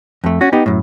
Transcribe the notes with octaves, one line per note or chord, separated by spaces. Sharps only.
F2 A3
C#4 F#4
B3 D#4 G4
F#2 A2